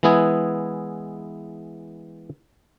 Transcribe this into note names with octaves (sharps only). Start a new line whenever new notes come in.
E3 G#3 B3 E4 G#4